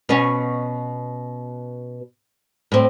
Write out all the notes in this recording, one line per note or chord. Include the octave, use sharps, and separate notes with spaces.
B2 B3 C#4
A2 C4